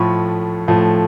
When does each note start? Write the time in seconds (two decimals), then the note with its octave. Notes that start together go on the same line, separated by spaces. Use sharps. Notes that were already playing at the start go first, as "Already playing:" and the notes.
Already playing: A2 F3 A3 B5 C#6
0.68 A2 F3 A3